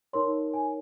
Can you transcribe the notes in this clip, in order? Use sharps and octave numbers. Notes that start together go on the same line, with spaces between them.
D#4 A#4 C#5 C6
G#5